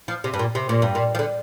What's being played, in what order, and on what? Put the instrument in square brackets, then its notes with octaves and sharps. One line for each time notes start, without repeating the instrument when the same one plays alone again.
[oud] F3
C3
G2
A#2
C3
A#2
G2
A#2
F3
D3